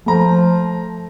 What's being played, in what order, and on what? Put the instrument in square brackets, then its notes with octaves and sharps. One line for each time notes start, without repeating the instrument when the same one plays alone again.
[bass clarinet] F3 [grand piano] A3 A#5